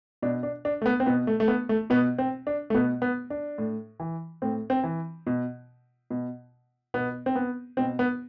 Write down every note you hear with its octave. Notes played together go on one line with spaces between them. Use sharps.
B2 D4
D4
D4
A3
B3
C4
B2 B3
A3
A3
B3
A3
B2 B3
C4
D4
A3
B2 B3
B3
D4
A2
E3
A2 C4
C4
E3
B2
B2
B2 B3
C4
B3
B2 C4
B3